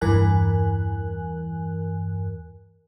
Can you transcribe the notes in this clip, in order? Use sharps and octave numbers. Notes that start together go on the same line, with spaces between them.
E2 G2 E3 A#4 G#5 F#6